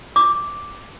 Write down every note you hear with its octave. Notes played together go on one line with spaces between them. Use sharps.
D6